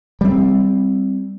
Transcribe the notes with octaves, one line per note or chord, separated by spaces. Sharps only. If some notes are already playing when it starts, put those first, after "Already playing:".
G3 C4